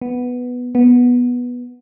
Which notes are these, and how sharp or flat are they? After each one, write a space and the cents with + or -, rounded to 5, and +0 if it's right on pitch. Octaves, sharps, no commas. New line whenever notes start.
B3 +0
B3 -10